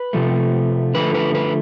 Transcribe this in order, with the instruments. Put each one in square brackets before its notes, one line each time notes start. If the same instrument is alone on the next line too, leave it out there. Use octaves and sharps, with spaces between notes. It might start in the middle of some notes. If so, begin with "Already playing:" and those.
Already playing: [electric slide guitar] B4
C3 F3 A3
D3 F3 A3 B4
B4
B4